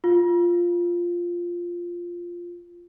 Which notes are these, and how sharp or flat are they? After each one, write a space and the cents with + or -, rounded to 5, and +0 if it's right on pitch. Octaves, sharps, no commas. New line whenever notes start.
F4 +0